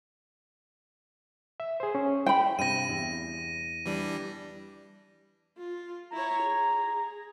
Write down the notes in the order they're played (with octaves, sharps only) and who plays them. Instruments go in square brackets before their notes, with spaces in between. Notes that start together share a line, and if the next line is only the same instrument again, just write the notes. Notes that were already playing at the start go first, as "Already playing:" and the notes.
[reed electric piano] E5
G#4 C5
C#4
[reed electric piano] C5 [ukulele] G5 B5
[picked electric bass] G2 C3 [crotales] A#6 D#7
[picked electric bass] E2
[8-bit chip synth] E3 G3 D4
[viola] F4
[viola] E4 C#5 [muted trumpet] A#5
[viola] G#4